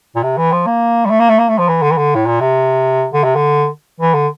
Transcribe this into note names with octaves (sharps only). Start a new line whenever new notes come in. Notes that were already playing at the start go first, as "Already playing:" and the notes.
A#2
C3
E3
F3
A#3
G3
A3
A#3
A3
A#3
A3
F3
E3
D3
E3
D3
A2
A#2
C3
D3
C3
D3
E3
D3